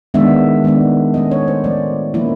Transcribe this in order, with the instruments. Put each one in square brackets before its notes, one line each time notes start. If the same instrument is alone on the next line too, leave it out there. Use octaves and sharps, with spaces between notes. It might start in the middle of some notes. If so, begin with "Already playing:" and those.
[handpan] D#3 G#3 B3 D4 E5
D#3 G#3 B3 D4
F3 A3 C#4 D#5
C#5
C5
F3 A3 C#4 D5
F3 A#3 C#4 E4